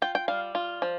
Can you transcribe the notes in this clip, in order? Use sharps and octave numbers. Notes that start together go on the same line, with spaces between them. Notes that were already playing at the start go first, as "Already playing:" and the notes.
F4 G5
G5
G3 F5
F4
F3